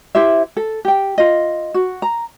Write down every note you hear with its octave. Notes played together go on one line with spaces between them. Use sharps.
E4 G4 C5 E5
A4
G4 G5
F4 D#5
F#4
A#5